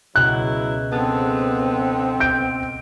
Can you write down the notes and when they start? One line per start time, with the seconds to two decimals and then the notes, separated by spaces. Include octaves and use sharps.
0.16 C#2 B2 F#3 E4 F#6
0.92 D3 F3 B3 C4 G#4 A5
2.20 G6 D7